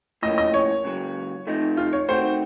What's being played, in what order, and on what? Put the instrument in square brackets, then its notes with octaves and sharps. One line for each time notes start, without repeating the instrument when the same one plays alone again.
[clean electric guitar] A2 F3 A#3 C#4 [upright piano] D#5
[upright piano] D#5
C#5
[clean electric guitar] C#2 C#3 F#3
C3 F3 A3 D#4
[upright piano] F4
C#5
[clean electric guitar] D#3 A3 C4 F#4 [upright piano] C5